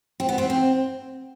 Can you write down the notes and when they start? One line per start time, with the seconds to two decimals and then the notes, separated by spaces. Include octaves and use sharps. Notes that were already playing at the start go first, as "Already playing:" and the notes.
0.20 C4
0.29 B3
0.38 C4
0.50 C4